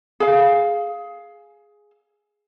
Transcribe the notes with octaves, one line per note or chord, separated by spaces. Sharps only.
G#4 F5